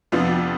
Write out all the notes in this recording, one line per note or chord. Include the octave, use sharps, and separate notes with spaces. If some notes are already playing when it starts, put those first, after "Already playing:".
F2 C3 F3 B3 D4 F4